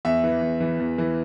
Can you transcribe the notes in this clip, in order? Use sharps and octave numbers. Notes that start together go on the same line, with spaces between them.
E2 E5
E3
E2
E3
E2
E3